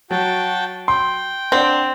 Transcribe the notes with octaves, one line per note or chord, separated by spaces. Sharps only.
F#3 F#4 G5 A5
G5 C6
C4 D4 F#5